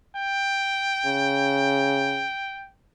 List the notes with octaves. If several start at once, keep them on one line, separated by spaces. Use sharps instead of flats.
G5
C#3